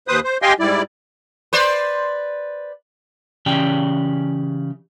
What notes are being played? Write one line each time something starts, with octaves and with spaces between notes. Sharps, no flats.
D#2 B4 C5 D#6
C5
G4 D#5 F5 G5 G#5 C6
G#2 G3 E4 D5
B4 C5 D5
C#3 E3 C#4 G4 D5 G5